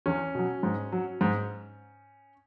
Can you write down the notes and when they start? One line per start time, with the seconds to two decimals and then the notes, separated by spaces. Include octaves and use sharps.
0.06 E2 C#4
0.35 B2 F#3
0.63 G#2
0.92 F#3
1.21 G#2